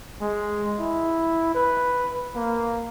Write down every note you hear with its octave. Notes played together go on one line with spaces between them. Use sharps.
G#3
E4
B4
A#3